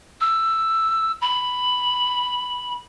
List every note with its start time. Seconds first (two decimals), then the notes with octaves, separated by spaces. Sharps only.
0.21 E6
1.21 B5